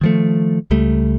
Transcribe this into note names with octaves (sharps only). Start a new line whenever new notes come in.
D#3 F3 A3
C#2 G3 A3